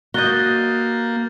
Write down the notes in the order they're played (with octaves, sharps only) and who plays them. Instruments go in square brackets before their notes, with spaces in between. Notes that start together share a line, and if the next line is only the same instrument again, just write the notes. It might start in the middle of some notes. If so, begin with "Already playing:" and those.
[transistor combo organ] A#3 [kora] F#4 D#5 [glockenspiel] G6 A6 G7